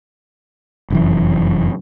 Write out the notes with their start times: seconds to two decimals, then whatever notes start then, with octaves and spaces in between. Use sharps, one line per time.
0.90 F1 F#2 E3